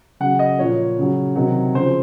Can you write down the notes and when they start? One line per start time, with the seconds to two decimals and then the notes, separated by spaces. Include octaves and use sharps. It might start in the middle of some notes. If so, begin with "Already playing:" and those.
0.20 C#3 F#3 F#5
0.39 D#5
0.58 A#2 F3 C#5
0.98 C#3 F#3
1.36 C3 D#3 F#3
1.75 C#3 F3 C5